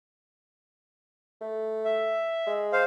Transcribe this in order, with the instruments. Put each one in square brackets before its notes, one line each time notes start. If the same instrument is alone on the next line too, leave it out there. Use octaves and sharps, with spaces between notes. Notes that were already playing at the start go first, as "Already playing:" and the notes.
[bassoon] A3
[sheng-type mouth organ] E5
[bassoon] G#3
[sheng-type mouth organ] C5 F5